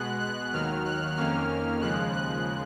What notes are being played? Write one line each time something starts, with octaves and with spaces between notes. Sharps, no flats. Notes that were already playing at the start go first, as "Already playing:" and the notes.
Already playing: B2 G#3 B3 F#6
F#6
D#2 D#3 F#3 F6
F#6
F2 D#3 A#3 C#4 F6
D#2 C#3 F3 G#3 F#6
F#6